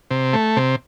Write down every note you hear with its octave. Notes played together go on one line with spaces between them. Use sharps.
C3
A3
C3